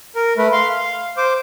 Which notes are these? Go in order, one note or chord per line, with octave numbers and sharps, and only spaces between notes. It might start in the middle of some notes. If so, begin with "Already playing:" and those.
A#4
A3 B4
F5 C6
F5
C5 D6